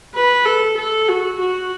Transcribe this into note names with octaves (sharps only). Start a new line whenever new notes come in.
B4
A4
A4
F#4
F#4